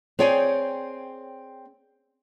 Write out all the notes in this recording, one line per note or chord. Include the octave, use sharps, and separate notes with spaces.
C4 G#4 C#5 D5 G5 G#5